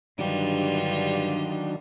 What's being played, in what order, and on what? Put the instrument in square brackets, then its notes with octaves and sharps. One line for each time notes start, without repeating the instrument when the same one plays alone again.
[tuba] G2 [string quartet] D3 G3 F4 [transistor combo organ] D#3 F#3 D4